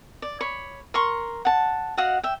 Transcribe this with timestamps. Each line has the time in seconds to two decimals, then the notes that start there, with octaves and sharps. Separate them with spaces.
0.22 D5
0.41 C#5 B5
0.94 A#4 C6 C#6
1.45 F#5 A5
1.97 F#4 D#5 F5 F#5
2.23 E5 G5